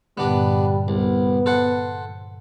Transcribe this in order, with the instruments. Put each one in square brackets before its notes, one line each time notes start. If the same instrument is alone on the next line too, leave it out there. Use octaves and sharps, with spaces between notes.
[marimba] G2 A#2 D3 [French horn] G3 [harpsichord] B3 D4
[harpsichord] C2 [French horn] B3
[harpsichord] A4 C5 F#5